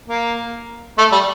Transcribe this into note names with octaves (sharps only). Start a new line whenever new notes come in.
A#3
A3
G3